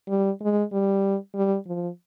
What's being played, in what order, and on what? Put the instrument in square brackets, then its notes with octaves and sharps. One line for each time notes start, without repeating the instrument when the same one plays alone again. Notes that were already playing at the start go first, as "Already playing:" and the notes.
[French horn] G3
G#3
G3
G3
F3